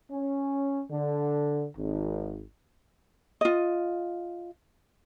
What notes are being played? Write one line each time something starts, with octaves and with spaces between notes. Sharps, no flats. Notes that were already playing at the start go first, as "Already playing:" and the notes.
C#4
D3
G#1
F4 D#5